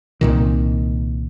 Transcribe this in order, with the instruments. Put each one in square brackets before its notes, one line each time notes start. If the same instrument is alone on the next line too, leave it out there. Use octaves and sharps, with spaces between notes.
[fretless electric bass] C2 A#2 D#3